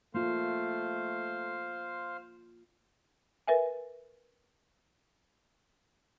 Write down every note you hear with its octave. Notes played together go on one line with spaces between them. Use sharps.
A3 A#3 F4 C5 F5 C6
A#4 B4 E5 G#5